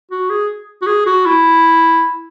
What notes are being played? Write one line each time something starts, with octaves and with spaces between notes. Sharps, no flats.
F#4
G#4
F#4
G#4
F#4
E4